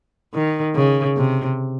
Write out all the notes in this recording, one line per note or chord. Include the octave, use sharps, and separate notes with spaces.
D#3
C#3
C3